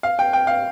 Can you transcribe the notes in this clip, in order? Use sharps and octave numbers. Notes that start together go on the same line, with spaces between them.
F5
G5
G5
F5